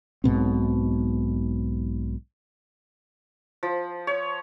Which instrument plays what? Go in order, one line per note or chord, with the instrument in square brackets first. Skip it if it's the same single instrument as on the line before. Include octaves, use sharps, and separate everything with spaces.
[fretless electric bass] B1 G#2 B2 C4
[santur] F3
C#5